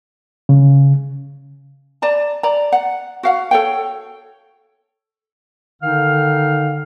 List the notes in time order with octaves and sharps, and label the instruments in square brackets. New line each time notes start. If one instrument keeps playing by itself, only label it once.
[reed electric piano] C#3
[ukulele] D5 A5 A#5
D5 A#5
F#5
F#4 F5 F#5
A4 C#5 G5
[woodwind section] D3 D#3 D#4 F5 F6